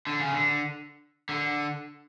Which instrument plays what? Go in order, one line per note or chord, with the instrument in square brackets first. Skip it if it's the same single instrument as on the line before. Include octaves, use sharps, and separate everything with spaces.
[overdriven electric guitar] D3
C#3
D3
D3